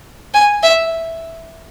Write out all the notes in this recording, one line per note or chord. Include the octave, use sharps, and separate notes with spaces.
G#5
E5